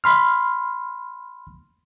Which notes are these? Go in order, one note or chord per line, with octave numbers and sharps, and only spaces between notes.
B5 C6 F6